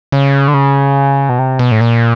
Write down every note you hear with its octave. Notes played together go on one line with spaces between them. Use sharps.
C#3
D3
C#3
B2
C3
B2
A2
A#2